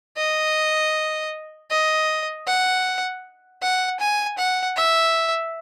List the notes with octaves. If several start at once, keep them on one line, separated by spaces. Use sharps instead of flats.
D#5
D#5
F#5
F#5
G#5
F#5
E5